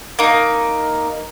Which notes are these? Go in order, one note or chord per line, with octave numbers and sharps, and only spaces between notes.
A#3 D#4